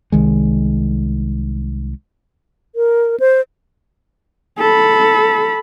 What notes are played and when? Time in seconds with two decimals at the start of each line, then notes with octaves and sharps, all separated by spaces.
0.12 C2 D#3 G#3
2.75 A#4
3.20 C5
4.59 A4 B5